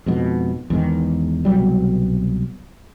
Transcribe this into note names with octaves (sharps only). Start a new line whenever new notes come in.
F2 G#2 B2
E2 G#2 D#3
C2 B2 F#3 G3